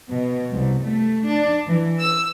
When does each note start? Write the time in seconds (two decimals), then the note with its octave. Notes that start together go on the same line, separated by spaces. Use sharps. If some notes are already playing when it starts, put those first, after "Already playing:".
0.10 B2
0.51 C2
0.86 A3
1.28 D4
1.66 E3
2.01 E6